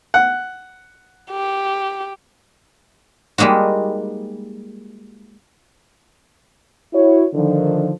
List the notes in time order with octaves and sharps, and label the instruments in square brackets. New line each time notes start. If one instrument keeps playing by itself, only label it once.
[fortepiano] F#5
[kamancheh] G4
[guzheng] G3 G#3 A#3 D#4 F#4
[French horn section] E4 F#4 C#5
D3 D#3 F3